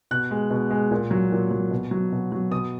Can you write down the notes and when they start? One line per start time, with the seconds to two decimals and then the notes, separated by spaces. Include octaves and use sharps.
0.11 B2 F#6
0.31 G#3
0.51 B2
0.71 G#3
0.91 A#2
1.11 F#3
1.32 A#2
1.51 F#3
1.71 B2
1.91 F#3
2.12 B2
2.32 F#3
2.52 B2 D#6